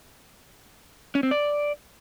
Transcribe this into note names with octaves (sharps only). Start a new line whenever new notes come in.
C#4
C4
D5